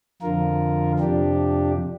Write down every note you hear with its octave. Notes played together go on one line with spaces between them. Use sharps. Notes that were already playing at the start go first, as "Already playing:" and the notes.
F2 D3 F3 F4 A#4
F2 C3 F3 D4 G4